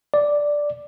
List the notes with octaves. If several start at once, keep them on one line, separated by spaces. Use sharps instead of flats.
D5